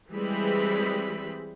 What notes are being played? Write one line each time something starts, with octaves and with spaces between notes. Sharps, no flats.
E3 G3 G#3 C4 G#4 B5